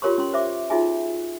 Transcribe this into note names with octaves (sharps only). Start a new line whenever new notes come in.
F4 G4 A#4 C#5 C6 C#6
C#4 C6
C5 E5 D6
D#4 F4 F#4 G#4 E5 G#5